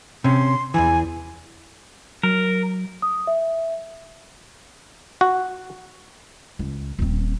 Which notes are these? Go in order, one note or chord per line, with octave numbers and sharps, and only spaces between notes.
C3 C#4 C6
E2 E3 G#5
F#3 A#4
D#6
E5
F#4
C#2
D#1 C4